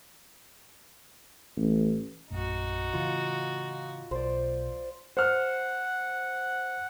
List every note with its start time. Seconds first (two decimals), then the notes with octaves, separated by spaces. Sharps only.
1.56 A1
2.30 A#1 F#2 A2 D#4 F#4
2.93 A2 C#3 E3 F4
4.11 B1 C5 D5
5.17 C5 F#5 F6